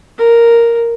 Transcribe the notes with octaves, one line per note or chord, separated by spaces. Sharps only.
A#4